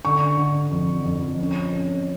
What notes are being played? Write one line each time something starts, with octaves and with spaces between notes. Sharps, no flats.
D3 C#6
D3
F2
F2
C#4
C#4